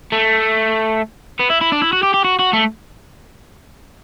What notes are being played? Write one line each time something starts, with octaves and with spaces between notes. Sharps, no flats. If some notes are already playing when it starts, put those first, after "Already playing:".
A3
B3
E4
E4
D4
E4
F#4
G4
G4
F#4
F#4
A3